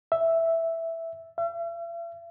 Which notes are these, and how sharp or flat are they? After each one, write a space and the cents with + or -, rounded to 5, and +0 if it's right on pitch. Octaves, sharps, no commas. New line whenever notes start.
E5 +0
E5 +45